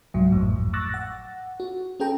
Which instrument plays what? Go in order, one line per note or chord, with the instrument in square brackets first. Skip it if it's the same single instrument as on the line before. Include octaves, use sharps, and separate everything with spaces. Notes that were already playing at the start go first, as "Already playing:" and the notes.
[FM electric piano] C2 G#2 F#3
G#1 F2 A2
C#6 D6 E6 F#6 A6 A#6
F#5
F#4
C#4 G#4 A4 G5 A#5